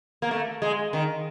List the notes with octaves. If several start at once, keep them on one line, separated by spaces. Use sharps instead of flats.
A#3
A3
G#3
D#3